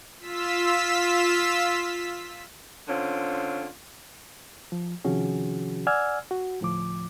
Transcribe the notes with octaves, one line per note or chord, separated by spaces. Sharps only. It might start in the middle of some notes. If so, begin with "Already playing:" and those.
F4 E6 B6
D3 C4 C#4 F4
F3
C3 D#3 F3 C#4 F#4 G#4
D5 F#5 G#5 E6 F6 G#6
F#4
D2 A2 F3 D6